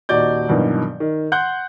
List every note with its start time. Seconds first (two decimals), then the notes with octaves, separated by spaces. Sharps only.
0.09 D#1 D#4 F#4 D5 G6
0.49 G2 B2 D#3 E3 F#3
1.00 D#3
1.32 F#5 C6 F#6 G6